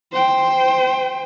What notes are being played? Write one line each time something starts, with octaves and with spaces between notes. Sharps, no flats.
C5 G5